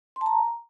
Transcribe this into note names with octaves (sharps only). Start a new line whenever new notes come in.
C6
A5
A#5